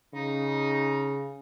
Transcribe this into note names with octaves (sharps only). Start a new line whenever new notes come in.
C#3 D#4